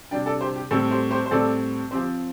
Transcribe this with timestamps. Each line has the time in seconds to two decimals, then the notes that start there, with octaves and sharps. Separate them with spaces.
0.11 C3 G3 D4 D5 G5
0.26 A4 D5
0.41 G4 C5
0.56 G4
0.71 A2 G3 C4 A4
0.91 G4 C5
1.11 G4 C5
1.26 C5
1.31 A2 G3 C4 A4 D5
1.91 F3 C4 G4 C5